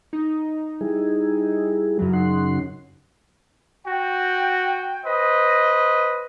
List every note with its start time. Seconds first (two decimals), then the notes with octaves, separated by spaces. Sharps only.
0.13 D#4
0.81 G3 E4 G#4
1.99 F#2 C#3 F#3
2.13 D#4 F#5 C6
3.86 F#4 G5
5.04 B4 C5 D#5